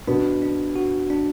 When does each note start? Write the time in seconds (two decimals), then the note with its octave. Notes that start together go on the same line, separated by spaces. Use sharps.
0.08 B2 B3 D4
0.42 D4
0.76 F#4
1.10 D4